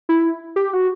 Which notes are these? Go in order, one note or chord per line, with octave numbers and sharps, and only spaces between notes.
E4
G4
F#4